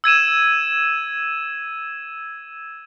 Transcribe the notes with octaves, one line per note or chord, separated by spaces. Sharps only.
E6 G#6 D#7 E7